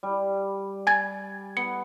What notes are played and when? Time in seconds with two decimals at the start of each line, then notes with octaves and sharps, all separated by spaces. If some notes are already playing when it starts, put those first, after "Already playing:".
0.03 G3
0.87 G#5 G#6 A6
1.57 B3 C#7